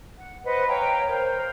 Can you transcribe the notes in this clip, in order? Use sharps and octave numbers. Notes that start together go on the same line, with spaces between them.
F#5
B4 C5 D#5 F#5
C#5 F5 G5 A#5
A#4 C5